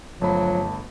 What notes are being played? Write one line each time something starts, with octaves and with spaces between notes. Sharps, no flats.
G1 F3 F#3 A3 A5 B5